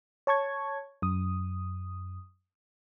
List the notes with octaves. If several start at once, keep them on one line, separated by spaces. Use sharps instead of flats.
C#5 A5 C#6 G#6
F#2 D#6